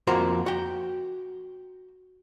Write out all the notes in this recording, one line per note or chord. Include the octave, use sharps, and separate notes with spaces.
F2 A#3 F4 F#4 C5 A#5
F#4 G5